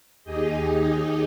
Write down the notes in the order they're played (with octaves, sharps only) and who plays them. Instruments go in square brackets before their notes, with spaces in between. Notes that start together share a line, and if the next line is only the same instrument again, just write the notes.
[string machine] D#2 D#4 G4 G#4 D#5